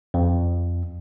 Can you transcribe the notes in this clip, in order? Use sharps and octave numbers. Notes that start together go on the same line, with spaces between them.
F2